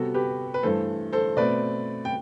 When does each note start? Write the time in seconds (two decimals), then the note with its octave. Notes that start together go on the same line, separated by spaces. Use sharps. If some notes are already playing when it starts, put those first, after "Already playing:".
Already playing: C3 G3 B3 F#4 A4
0.14 G4 B4
0.54 B4
0.63 G2 E3 A3 A4 C5
1.13 A4 C5
1.37 B2 A3 C4 B4 D5
2.05 G5